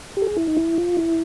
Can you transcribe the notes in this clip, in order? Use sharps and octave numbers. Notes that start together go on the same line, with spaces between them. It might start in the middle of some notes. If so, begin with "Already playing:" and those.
G4
A4
G#4
E4
D#4
E4
F4
E4